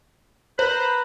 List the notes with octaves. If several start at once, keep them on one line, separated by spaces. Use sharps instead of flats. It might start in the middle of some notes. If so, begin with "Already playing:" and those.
B4 C5 A#5 B5